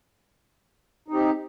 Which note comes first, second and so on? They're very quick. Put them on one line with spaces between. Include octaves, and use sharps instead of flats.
D#4 C4 G4